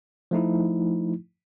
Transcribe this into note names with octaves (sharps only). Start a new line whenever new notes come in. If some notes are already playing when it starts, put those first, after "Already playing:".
F3 A3 D#4 E4